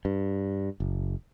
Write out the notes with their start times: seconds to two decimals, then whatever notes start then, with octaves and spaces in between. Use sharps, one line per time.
0.05 G2
0.80 F#1